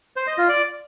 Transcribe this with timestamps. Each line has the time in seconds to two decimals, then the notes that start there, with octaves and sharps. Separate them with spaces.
0.16 C5
0.27 D#5
0.38 F4
0.49 D5